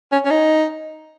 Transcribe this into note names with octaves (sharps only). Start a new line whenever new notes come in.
C#4
C#4
D#4